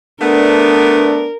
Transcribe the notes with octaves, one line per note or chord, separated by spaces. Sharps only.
A3 B3 D4 A#4